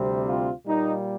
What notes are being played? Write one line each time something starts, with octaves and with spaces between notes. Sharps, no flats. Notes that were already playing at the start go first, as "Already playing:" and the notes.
Already playing: D2 C3 G3 C4
F4
A#2 G3 A#3 D#4